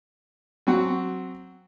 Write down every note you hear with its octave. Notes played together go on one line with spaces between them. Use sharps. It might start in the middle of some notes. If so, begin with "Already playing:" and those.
F#3 C4 F#4